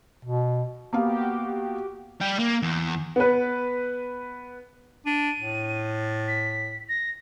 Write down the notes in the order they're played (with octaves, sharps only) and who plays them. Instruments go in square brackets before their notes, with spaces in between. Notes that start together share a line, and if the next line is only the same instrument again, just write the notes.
[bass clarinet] B2
[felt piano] A#3 B3 F5 [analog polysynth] F#4 G4
[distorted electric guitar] G3 G4
A#3
E2
[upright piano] B3 B4
[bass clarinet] D4 [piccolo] D#7
[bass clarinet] A2
[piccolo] B6
A#6